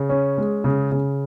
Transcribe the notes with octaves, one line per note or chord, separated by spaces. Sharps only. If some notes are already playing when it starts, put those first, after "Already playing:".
Already playing: C#3
C#4
G#3
C#3
C#3